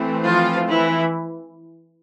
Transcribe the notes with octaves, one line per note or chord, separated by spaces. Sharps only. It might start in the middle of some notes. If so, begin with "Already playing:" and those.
Already playing: E3 A3 C4
F3 F4
E3 E4